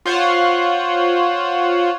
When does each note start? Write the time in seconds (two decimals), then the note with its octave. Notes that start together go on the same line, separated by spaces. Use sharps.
0.06 F4 C5 C#5 F#5